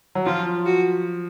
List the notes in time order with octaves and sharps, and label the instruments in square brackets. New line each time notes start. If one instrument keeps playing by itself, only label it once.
[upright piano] F#3
[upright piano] F3 [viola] F4
[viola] F#4